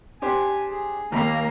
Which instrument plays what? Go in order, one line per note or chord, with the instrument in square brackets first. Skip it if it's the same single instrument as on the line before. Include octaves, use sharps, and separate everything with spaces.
[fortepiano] D4 G4 C5 [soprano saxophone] G#5
[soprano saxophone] G#4
[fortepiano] D#2 B5 [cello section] A#3 [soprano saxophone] A#5